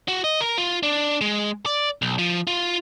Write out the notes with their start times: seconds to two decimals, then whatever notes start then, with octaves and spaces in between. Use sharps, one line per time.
0.08 F#4
0.24 D#5
0.41 A#4
0.58 F4
0.83 D4
1.21 G#3
1.66 D5
2.02 B1
2.18 F3
2.47 F4